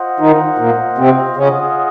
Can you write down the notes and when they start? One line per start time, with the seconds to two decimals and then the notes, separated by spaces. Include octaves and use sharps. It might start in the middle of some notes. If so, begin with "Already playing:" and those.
Already playing: F4 C5 D#5 F#5
0.20 D#3 D#4
0.58 A#2 A#3
0.98 C3 C4
1.37 C#3 C#4 F4 G#4 D#5 F#5